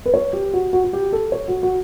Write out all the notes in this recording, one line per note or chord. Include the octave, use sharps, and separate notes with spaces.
B4
C#5
G4
F#4
F#4
F#4
G4
A4
C#5
F#4
F#4